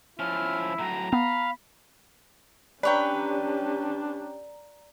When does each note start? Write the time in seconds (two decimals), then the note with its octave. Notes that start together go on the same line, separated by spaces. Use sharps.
0.19 F3 C#4 E4 F6
0.79 A2 F#3 A#5
1.13 B3 F5 B5
2.83 C#4 D4 G4 B4 C#5 D5 G5 A#5